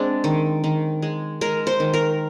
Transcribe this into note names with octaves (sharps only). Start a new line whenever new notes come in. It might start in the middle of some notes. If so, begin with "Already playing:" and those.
Already playing: G#3 C4 D4
D#3
D#3
G#3
G#3 A#4
C5
D#3
A#4